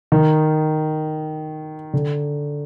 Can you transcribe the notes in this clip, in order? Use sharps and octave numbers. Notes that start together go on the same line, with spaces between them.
D#3
D3